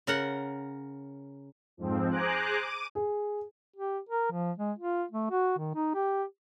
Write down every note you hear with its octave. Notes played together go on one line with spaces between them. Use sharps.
C#3 A#4 F#5
F2 G#2 F3 C4
G#4 C5 G#5 A#5 D6 F#6
D6 D#7
G#4
G4
A#4
F3
G#3
F4
A3
F#4
D#3
D#4
G4